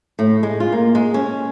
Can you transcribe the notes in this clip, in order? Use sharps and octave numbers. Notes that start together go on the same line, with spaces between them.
A2
G#3
F4
A#3
G#3
C#4